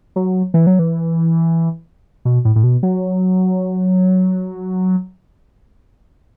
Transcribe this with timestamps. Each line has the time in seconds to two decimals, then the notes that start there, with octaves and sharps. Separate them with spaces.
0.16 F#3
0.54 E3
0.67 F#3
0.79 E3
2.25 B2
2.45 A2
2.56 A2
2.63 B2
2.83 F#3